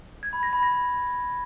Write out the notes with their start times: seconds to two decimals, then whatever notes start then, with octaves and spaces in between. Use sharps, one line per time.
0.23 G#6
0.33 B5
0.43 A#6
0.53 B5
0.63 A#6